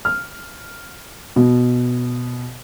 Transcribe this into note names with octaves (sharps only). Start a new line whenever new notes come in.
F6
B2